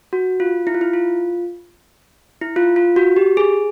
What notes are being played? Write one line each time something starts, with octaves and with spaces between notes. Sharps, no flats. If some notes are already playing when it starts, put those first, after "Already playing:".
F#4
F4
E4
F4
E4
F4
E4
F4
F4
F#4
G4
G#4